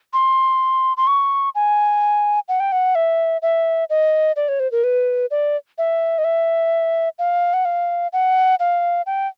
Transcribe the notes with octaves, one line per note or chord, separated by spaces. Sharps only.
C6
C6
C#6
G#5
F#5
G5
F#5
E5
E5
D#5
D5
C#5
C5
A#4
B4
D5
E5
D#5
E5
F5
F#5
F5
F#5
F5
G5